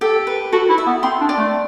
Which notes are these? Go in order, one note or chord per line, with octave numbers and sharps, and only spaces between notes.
G4 A4
B4
F#4 A4
E4
E5
B3
C4 C6
D4
D5
A3